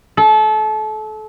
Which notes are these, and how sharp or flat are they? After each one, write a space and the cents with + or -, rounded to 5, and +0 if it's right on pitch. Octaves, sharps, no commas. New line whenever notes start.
A4 -30